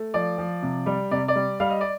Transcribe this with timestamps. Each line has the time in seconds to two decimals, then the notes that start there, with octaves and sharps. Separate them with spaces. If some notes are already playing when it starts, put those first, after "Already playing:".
Already playing: A3
0.14 F3 D5
0.38 F3
0.63 C3
0.86 G3
1.11 C3 D5
1.28 D5
1.35 G3
1.60 G3 F5
1.70 D#5
1.81 D5